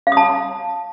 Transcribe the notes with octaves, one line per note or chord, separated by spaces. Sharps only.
F5
D#6
A5